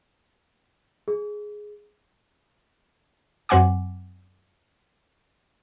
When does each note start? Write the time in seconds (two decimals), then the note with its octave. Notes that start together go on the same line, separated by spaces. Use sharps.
1.08 G#4
3.49 F#2 F#3 C4 F#5 G#5 D6